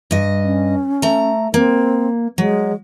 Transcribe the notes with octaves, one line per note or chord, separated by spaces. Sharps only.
G2 D#5
C#4
A3 A#5
A#3 C4
F#3 G#3